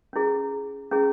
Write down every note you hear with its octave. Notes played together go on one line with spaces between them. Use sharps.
C#4 E4 G#4
C#4 E4 G#4